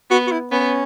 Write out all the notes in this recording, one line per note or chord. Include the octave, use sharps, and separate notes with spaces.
B3 F#4
F#4
E4
B3 C#4